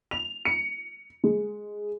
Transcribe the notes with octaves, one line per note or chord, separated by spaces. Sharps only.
F7
C#7
G#3